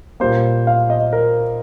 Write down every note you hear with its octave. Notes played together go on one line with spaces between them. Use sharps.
A#2 G3 A#3 C5
F5
D#5
A#4